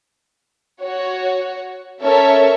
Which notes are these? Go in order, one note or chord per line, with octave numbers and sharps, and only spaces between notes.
F#4 C#5
C#4 A4 A#4 C#5 E5